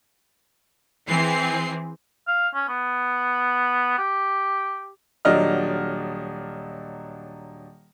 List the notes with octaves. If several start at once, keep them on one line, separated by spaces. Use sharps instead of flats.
E3 C4 G#4 C7
F5
C#4
B3
G4
D#1 F#3 D4 D#5 F6